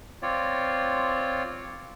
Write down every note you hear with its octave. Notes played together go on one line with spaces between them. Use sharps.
C4 F4 C#5 D5